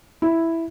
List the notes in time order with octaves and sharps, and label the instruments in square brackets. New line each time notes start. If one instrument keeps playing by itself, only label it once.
[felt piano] E4